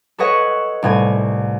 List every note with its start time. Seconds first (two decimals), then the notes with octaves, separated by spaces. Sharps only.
0.18 A4 B4 C#5 D#5 F#5
0.82 C2 A2 G#5